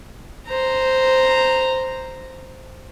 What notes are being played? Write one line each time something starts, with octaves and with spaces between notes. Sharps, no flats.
C5 A#5